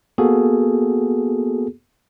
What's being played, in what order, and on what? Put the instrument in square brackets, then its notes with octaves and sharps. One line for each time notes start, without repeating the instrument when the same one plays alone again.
[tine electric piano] A#3 B3 F#4 G#4 A4